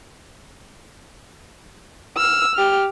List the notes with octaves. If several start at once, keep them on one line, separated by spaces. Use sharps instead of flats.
E6 F6
G4 F6